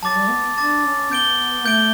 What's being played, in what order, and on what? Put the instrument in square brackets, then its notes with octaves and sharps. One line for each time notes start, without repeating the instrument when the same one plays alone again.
[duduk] F#3 [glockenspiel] A5 D6 A6
[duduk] G3
B3
[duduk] D4 [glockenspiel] A5 D6 A6
[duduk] C#4
[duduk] B3 [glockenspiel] G6 D7 G7
[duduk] A3 [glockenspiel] G6 D7 G7